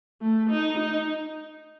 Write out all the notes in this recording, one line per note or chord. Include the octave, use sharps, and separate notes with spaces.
A3
D#4
D#4